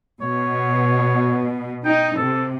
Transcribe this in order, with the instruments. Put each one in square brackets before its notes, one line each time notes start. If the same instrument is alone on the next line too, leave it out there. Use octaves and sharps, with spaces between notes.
[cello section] B2 [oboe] C#5
[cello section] D#4 [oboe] G5
[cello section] C3 [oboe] A4